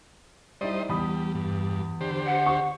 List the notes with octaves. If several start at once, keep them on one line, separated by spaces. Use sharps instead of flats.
G3 D#4 E4 C5 D5 D#5
E2 G3 B5 D#6
G2
D3 G4 C5
F#5
C#6